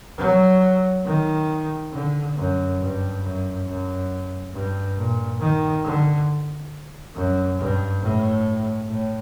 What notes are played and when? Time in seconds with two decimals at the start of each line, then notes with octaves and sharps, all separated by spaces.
0.18 F#3
1.05 D#3
1.93 D3
2.36 F#2
2.80 G2
3.23 F#2
3.67 F#2
4.53 G2
4.97 A#2
5.40 D#3
5.84 D3
7.15 F#2
7.58 G2
8.02 A2
8.88 A2